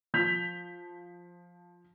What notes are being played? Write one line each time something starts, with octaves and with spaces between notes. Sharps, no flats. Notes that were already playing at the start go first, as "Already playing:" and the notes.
F3 G6 B6 F7